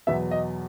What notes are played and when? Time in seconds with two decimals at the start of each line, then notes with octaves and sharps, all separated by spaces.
0.07 E2 B2 F#3 B3 E5
0.31 D#5